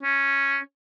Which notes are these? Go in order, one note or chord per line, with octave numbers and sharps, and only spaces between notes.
C#4